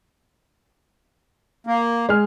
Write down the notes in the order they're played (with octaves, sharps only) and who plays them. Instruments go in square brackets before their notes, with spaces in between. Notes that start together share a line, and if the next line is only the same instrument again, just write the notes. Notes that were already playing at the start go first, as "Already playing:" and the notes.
[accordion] A#3
[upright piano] G#3 G#4 F6